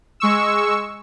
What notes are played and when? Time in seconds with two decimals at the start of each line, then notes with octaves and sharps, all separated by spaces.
0.20 G#3 C#6 E6